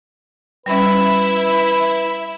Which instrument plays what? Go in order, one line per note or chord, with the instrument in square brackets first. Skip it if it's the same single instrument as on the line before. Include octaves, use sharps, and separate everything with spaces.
[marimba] G3 C#4 [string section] E4 [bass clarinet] B4